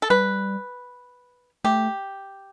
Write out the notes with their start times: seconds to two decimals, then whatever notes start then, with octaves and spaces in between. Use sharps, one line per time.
0.02 A4
0.10 G3 B4
1.64 A3 G4